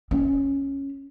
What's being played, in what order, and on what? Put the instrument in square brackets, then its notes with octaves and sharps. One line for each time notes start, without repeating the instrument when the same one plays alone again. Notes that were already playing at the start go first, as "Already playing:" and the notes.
[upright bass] C#4